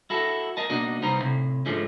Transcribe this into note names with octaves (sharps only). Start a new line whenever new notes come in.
E4 F#4 A4
A#4 D#5 A5
B2 A#3 D4 D#4 F#4 D#5
C2 B3 D#4 C5 A#5
A2 C3
G#2 D3 F3 G#3 A3 C#4